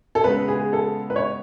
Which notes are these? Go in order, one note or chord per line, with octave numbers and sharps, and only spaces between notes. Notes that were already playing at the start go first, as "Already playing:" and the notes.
A4
C#3 G#3 B3 B4
G#4
A4
B4
C#5